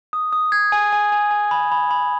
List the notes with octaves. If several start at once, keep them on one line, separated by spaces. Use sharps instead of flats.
D#6
D#6
G#6
G#5
G#5
G#5
G#5
B5
B5
B5